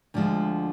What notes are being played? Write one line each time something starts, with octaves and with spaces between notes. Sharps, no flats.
D2 D3 F3 G#3